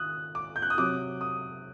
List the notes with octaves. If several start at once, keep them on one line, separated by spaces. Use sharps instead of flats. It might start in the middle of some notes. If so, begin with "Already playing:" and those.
Already playing: D#3 D#6 F#6
D6
G6
F#6
D#6
C3 F#3 D6
D#6